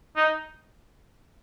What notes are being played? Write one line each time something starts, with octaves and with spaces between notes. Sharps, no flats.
D#4